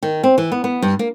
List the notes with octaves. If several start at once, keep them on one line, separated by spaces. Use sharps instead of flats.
D#3
C4
E3
B3
B3
G2
A#3